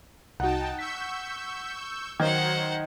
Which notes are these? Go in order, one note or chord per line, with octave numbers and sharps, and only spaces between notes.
C2 D#4 F#4 F#5 G5 A5
C#6 E6 G6 B6
D#3 F#3 C5 D#5 F#5 A#5 G#6